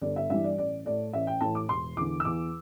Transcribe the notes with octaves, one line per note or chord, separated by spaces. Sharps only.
G1 D5
E5
G2 E3 G3 E5
D5
A1 D5
A2 A3 D5
A1 E5
G5
A2 E3 A5
D6
E1 C6
E2 D3 D6
E6
E2 D6